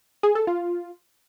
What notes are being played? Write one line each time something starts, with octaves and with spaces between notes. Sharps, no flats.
G#4
A4
F4